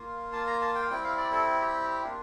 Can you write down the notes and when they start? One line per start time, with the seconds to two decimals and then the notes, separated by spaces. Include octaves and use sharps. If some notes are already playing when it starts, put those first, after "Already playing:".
Already playing: A#3 F4
0.33 A5
0.47 A#5
0.61 A5
0.75 G5
0.82 F5
0.90 G3 C4 E4 G5
1.04 F5
1.18 D5
1.32 A4
1.61 G4
2.04 A#3 D4 F4